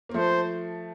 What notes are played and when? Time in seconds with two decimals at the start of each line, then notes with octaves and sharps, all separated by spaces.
0.09 A#3
0.14 F3 A3 C5